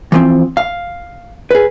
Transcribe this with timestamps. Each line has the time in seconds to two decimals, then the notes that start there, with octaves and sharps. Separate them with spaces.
0.12 E3 F3 C4
0.57 F5
1.51 G#4 B4